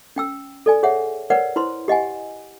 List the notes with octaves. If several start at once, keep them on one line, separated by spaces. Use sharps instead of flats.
C#4 G5 E6
A4 D5 G#5
G#4 C#5 E5 F#5
A#4 B4 C#5 D5 F#5
E4 B4 C5 C6
G4 D#5 F#5 G#5